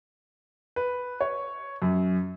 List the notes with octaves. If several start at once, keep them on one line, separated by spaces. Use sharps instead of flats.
B4
C#5
F#2